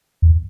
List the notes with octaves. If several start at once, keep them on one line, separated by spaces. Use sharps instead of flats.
E2